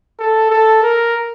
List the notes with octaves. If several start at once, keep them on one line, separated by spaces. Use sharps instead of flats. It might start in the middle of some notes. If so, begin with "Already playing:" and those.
A4
A4
A#4